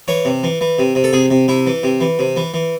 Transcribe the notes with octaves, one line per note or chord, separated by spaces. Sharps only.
E3 C#5
C3
E3
E3
C3
C3
A4
C3 G#4
C3
C3 E4
E3
C3
E3
C3
E3
E3